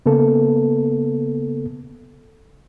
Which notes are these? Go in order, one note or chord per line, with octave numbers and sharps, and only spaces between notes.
C#3 A#3 B3 A4